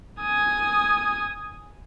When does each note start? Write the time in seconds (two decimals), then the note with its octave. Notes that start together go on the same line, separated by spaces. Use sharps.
0.22 G#5 D#6